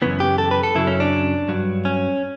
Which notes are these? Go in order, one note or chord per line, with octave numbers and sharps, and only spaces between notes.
F#2 C#3 E3 B3
G4
A4
B4
A4
F#2 C#3 F#3 E4
C#4
D4
G2 F#3
C#4